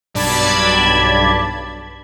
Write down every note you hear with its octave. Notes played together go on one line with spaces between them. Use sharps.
B1 G2 D5 A5 B5 G#6